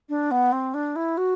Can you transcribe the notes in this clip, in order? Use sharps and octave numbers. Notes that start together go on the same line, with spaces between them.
D4
B3
C4
D4
E4
F#4